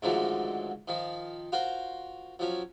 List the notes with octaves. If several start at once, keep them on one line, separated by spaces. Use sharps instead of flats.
G#2 D3 D#3 F3 F#3 A3
D#3 F3
F4 F#4 A#4 C5
F3 F#3 C#4